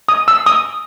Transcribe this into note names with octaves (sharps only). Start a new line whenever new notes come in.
D#6
E6
D#6